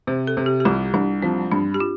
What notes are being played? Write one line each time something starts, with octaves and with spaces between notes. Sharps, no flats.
C3 C5
A4
C3
G4
G4
C2 F4
C2 D4
F3 C4
G2 D4
G4
F4